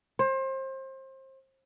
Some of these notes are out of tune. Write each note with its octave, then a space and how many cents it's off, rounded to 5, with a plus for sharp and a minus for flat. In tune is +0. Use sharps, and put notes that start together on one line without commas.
C5 +30